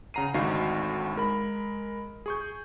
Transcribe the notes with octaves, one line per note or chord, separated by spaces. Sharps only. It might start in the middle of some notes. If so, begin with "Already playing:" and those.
C#3 F#5 A#5 C7 D#7
G#1 D2 D#4 F#4 F5 C7
G#3 A#4 B5
G#4 C#6 G6